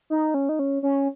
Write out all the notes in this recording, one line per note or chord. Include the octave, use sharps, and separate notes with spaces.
D#4
C#4
D#4
C#4
C#4